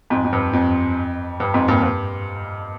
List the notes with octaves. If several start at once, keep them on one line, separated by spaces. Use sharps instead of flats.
F2 G#2
F2
G2
F2
G2
F2 G#2
G2 A#2
G2